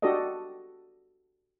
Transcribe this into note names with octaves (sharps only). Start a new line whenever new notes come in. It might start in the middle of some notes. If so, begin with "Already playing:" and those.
D4 F#4 G4 A4 D5 D#5